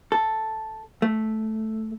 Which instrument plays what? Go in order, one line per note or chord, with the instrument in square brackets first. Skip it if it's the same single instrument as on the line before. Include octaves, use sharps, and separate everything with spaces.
[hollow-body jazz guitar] A4
A3